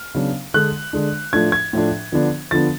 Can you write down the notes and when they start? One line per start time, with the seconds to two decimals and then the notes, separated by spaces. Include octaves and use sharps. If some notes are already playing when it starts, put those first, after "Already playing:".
Already playing: F6
0.15 C#3 F#3 B3 D4
0.54 D3 G#3 D4 F#6
0.93 D3 G#3 D4
1.33 A2 F3 A3 D4 G#6
1.52 G#6
1.73 A2 F3 A3 D4
2.12 D3 F3 B3 D4
2.51 D3 F3 B3 D4 A6